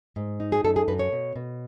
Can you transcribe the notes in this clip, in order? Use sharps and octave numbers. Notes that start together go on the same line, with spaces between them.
G#2
D#4
G#4
F#2 A4
G#4
F#2 B4
C#5
B2
B2